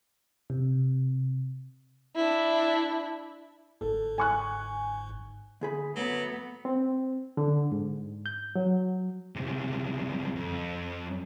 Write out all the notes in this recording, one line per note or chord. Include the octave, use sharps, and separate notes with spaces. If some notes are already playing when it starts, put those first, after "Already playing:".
C3
D4 E4
G1 G#2 A4
G#5 C#6 F#6
D2 G#4 B5
F#3 A3 B3
C4
D3
G#2
G6
F#3
C#2 C3
F2